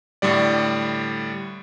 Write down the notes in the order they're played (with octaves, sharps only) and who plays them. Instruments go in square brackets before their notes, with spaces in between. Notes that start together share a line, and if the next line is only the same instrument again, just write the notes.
[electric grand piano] A2 D3 G3 D5